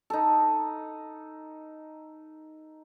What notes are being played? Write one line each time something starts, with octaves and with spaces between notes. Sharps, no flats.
D#4 A4